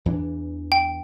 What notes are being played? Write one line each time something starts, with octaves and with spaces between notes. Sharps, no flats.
E2 E3 D4
G5